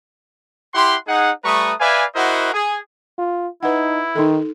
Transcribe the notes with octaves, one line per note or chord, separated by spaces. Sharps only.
E4 G4 F#5 C6
D#4 G#4 F#5
G3 A3 B4 A#5 C#6 D#6
B4 D5 E5 F5 G#5
E4 F#4 A#4 C5 D#5 F#5
G#4
F4
D#4 E4 B4 F#5
D#3 D#4 A4